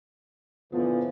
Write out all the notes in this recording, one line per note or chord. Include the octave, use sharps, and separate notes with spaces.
A#2 D3 E3 F3 B3 E4